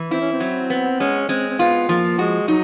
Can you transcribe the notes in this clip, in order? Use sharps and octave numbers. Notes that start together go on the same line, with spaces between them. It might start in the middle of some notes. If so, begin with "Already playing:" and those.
Already playing: E3
C4 E4
C#4
C4
F#3
B3
G#3 C#4
G#3 C4
C4
B3 F4
F3 A#3
G#3 F#4
F#3 D#4